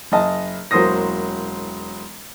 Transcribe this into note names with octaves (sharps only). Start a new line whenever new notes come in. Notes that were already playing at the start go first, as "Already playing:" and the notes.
F#1 D#5 A5
E1 F#3 A#3 C5 D#6 A#6